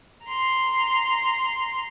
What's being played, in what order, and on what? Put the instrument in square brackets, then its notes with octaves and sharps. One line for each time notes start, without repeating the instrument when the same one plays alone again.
[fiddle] A#5 C6